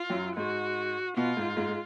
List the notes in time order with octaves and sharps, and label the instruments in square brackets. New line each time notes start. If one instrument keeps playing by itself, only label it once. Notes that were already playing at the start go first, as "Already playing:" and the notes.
Already playing: [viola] F4
[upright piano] F#2 F#3
[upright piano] G#2 G#3 [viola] F#4
[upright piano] B2 B3 [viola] F4
[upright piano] G#2 G#3
G#2 G#3
G#3